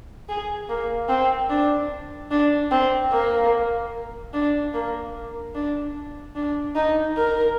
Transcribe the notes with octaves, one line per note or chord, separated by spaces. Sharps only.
G#4
A#3
C4
D4
D4
C4
A#3
D4
A#3
D4
D4
D#4
A#4